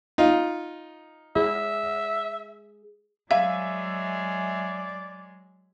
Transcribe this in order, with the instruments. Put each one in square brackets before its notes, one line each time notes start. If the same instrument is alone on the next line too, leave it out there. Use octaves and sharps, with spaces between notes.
[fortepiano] D#4 F4
[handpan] G#4 [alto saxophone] E5
[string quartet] F#3 G#3 [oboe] D5 [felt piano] E5 G#5 [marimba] F5